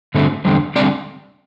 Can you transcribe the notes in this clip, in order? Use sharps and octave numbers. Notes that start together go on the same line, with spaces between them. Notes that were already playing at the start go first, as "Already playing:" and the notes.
G2 D3 A3 C4
E2 D3 G3 C4
D3 G3 C4 D5